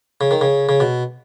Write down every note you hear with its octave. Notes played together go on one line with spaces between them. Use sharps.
C#3
D#3
C#3
C#3
B2